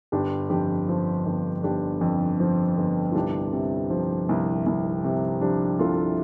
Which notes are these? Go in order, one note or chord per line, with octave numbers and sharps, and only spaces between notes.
G1 D4 G4
F2 D4 G4
F3
G1
G1 D4 G4
F2
F3
G1
F4
C2 D4 G4
C3
F3
C2
C2
C3
F3 D4 G4
C2 F4 A4